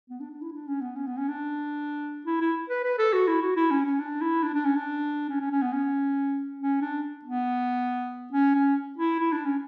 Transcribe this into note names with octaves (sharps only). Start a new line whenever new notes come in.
B3
D4
D4
E4
D4
C#4
B3
C#4
B3
C#4
D4
E4
E4
B4
B4
A4
F#4
E4
F#4
E4
C#4
C#4
D4
E4
D4
D4
C#4
D4
C#4
C#4
C#4
B3
C#4
C#4
D4
B3
C#4
C#4
E4
E4
D4
C#4